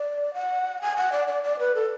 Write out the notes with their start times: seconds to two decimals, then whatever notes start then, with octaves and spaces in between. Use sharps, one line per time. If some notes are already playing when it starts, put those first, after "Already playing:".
Already playing: D5
0.34 F#5
0.82 G#5
0.97 F#5
1.12 D5
1.28 D5
1.43 D5
1.59 B4
1.75 A4